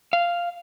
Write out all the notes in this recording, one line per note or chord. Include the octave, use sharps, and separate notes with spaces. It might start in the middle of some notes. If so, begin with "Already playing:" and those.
F5